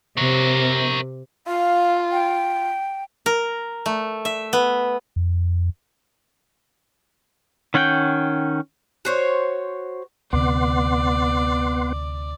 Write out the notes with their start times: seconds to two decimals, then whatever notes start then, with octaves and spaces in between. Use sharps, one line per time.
0.17 C3 A#4 C#5
1.47 F4 F5
2.12 G5
3.26 A#4
3.86 A3
4.25 E5
4.53 B3
5.16 F2
7.74 D#3 C#4 F#5 G5 G6
9.05 F#4 C5 C#5
10.33 D2 C3 B3 D5 F#5 C6